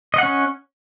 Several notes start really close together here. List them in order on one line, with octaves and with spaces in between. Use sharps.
D#5 F#5 C#4